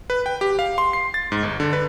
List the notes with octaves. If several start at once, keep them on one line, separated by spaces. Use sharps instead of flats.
B4
G5
G4
F5
C6
C7
A6
G#2
G1
D3
B4